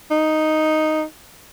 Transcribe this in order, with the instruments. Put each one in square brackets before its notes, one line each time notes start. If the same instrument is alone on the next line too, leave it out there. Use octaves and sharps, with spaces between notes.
[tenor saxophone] D#4